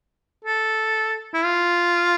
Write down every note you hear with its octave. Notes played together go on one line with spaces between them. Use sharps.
A4
E4
F4